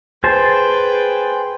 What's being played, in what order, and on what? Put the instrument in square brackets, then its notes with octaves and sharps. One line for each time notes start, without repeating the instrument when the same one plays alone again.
[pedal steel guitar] G#4 C5 A5 [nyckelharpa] B4 G5